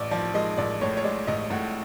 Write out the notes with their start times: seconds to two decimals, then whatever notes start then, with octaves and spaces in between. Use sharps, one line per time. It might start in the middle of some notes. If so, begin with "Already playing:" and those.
Already playing: A1 D5
0.11 F3 D5
0.34 G#3 D#5
0.57 A1 D5
0.81 A2 C#5
0.97 C#5
1.04 G#3 D5
1.27 A1 D#5
1.50 A2 F#5